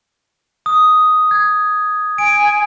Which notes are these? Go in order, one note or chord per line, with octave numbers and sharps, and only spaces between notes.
D#6
G#6
G#5 D7